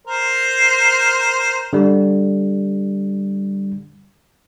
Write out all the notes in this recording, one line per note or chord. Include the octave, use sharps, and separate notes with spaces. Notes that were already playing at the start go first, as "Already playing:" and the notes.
A#4 C5
D3 G3